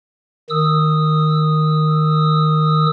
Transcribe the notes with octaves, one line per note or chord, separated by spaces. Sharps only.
D#3 D#6 E6